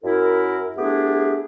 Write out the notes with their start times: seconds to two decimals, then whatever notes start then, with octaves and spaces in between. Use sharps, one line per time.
0.02 F#2 E4 A#4
0.77 A3 B3 D4 E4 G4 G#4